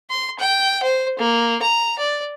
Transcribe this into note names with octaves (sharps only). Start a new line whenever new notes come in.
C6
G5
C5
A#3
A#5
D5